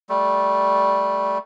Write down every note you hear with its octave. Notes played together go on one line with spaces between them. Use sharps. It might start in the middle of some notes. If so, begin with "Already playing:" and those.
G3 A3